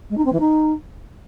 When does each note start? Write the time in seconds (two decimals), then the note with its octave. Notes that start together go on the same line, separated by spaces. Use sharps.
0.10 G#3
0.17 D#4
0.25 C4
0.32 E3
0.40 D#4